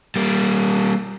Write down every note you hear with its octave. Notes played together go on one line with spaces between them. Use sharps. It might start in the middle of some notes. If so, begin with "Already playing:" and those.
G3 A#3